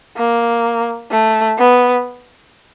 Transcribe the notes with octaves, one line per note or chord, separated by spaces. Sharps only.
A#3
A3
B3